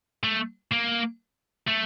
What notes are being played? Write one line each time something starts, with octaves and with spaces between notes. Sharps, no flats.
A3
A#3
A3